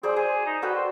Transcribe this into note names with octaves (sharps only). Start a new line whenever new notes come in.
C4 G#4 C5 D5
G#4 C5
D#4
F#4 A4 B4 G5
C5